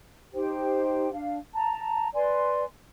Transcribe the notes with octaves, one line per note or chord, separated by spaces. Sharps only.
D#4 G4 C5 G5
D4 F5
A5 A#5
B4 D5 G#5 C6